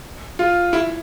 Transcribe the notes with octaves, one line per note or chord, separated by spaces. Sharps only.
F4
E4